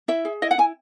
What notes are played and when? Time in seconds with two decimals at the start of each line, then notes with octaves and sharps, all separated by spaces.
0.08 E4 E5
0.25 G#4
0.42 E4 D#5
0.51 F#5
0.58 E4 G#5